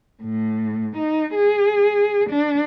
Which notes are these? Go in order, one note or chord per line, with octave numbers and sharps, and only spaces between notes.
A2
D#4
G#4
D4